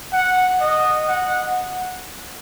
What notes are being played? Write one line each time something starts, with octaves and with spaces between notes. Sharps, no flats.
F#5
D#5
F#5